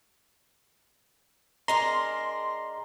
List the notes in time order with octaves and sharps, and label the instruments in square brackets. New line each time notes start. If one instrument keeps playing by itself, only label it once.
[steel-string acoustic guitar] G#3 D4 A#4 [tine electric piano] A#5 [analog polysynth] C6